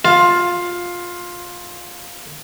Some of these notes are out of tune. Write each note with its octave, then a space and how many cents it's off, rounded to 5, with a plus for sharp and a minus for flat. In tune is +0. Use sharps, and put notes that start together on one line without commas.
F4 +10